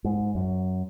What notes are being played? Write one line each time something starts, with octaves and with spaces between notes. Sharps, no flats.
G#2
F#2